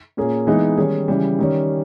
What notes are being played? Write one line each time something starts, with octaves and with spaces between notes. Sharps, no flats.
A#2 A#3 C#4 G#4
E3 G#3 B3 D#4
D#3 G3 C#4 G#4
C#3 E3 G3
D#3 G3 C#4